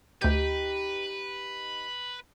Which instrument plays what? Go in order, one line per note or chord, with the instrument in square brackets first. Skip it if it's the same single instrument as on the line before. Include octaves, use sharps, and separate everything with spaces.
[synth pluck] D2 G6 [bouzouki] D#4 G4 [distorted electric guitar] B4